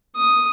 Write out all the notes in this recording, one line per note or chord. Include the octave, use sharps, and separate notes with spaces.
D#6